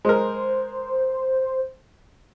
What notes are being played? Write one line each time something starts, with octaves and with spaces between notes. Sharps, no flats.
G#3 A#4 C5